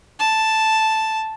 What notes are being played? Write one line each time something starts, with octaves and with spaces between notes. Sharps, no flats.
A5